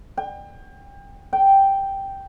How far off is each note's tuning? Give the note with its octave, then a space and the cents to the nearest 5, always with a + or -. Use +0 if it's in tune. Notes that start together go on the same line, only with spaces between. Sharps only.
G5 +35
G5 -5